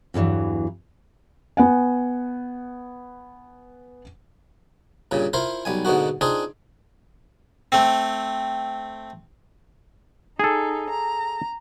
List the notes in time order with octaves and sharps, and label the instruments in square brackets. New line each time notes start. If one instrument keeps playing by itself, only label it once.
[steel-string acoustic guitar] E2 G2 C3 E3 F#3
[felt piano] B3 F#5 G#5
[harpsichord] G2 A#2 C#3
E4 F4 A#4 C5
B1 G3 G#5
G#2 B2 D3 A#3 F#4
C4 D4 D#4 F4 G#4
A3 C4
[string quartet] D#4 [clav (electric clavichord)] G#4 A4
[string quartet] A#5